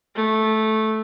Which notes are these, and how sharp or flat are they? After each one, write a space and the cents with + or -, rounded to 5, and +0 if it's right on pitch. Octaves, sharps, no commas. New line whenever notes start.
A3 -10